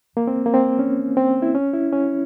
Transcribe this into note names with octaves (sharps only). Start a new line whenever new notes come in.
A#3
C4
A#3
C4
C#4
C4
E4
C#4
E4
C#4